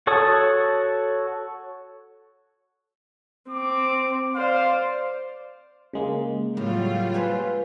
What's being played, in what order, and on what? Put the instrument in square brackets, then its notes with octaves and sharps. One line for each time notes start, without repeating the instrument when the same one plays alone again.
[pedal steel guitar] F#4 A4 C#5 A5 D#6
[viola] C4 [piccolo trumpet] D6
[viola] C5 D5 [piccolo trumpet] F5
[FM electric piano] C#3 G#3 A#3
[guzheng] A2 [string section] F#3 G3 F4
[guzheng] B4 C5 G#5